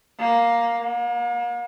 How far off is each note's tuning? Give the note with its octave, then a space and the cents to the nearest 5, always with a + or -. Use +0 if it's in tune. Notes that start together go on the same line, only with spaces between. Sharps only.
A#3 +5
A#3 +40